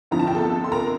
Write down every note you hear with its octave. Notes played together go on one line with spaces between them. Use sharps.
G1 F2 D3 F3 A#5
A5
G5
A4 A5
C6
A#4 A#5